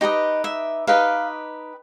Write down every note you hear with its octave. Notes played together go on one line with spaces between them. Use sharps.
D#4 G4 B4 D#5
E5
D#4 G4 B4 D#5 F5